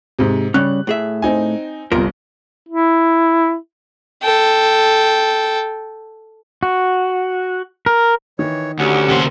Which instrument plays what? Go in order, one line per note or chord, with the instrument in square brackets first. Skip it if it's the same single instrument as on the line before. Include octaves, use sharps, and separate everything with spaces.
[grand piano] G#2 C3
[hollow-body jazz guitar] C#3 G3 C#4 [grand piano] F#6
[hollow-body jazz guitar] A2 G#4 E5
[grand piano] C4 D#4 G#5
[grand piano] G1 C2 [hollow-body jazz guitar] F4 A#4
[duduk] E4
[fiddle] A4 G5
[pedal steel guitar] F#4
A#4
[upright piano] D#3 [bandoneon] E3 C#5
[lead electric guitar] D2 [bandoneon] D3 C#4 F#5 [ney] G4
[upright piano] D#2 A#2 [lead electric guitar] C#3 C5